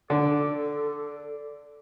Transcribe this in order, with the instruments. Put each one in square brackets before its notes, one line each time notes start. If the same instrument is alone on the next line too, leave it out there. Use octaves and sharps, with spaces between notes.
[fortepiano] D3 [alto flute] A4 [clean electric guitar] D5